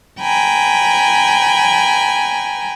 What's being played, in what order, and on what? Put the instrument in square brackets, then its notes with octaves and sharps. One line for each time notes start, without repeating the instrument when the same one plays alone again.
[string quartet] G5 G#5 A#5 B5